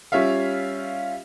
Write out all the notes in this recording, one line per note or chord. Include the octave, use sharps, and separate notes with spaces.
G3 C#4 F4 E5 F5